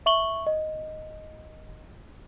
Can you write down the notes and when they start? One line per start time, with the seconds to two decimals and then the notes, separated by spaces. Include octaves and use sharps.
0.06 E5 C#6 F#7 G7
0.47 D#5